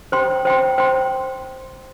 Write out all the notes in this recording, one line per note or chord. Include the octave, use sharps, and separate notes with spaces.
C5 G5 C6
C5 G5 C6
C5 G5 C6